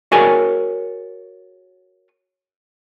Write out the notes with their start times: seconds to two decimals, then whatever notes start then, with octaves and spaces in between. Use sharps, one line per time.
0.12 F#4 G#4 A#4 C#5 D5 G#5